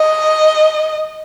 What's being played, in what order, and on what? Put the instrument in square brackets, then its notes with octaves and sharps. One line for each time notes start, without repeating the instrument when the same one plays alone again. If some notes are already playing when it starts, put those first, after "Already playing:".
Already playing: [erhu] D#5